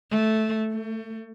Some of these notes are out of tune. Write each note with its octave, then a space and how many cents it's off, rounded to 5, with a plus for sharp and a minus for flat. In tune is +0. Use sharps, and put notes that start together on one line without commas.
A3 -10
A3 +35